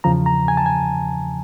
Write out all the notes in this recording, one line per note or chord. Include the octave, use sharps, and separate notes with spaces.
E2 C#3 F3 A#5
A#5
G#5
A5
G#5